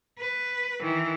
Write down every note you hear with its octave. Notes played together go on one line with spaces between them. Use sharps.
B4
D#3 E3